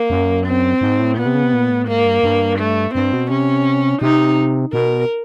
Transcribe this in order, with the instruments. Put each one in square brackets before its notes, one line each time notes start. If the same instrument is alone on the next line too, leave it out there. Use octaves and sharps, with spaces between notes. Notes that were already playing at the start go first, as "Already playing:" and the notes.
Already playing: [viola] A#3
[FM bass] F#2
[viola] C4
[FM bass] G#2
A2
[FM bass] A#2 [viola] B3
[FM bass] C3
C#3
C3
A#2
A2
[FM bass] G#2 [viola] A#3
[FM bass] G2
G2
[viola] A3
[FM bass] G2 [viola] C4
[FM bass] B2
[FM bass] C3 [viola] C#4
[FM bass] C3 [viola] D#4
[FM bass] B2 [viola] A#4